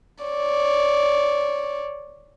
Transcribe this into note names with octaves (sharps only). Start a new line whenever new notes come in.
C#5 D5